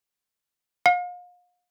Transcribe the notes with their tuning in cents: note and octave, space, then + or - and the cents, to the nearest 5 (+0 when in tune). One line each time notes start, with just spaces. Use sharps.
F5 +35